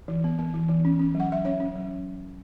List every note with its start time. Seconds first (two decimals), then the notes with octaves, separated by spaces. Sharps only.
0.08 E3
0.24 B3
0.39 B3
0.54 E3
0.69 E3
0.85 C#4
0.99 C#4
1.15 F#3
1.20 F#5
1.29 F#3 E5
1.45 C#4 C#5
1.60 C#4
1.75 F#3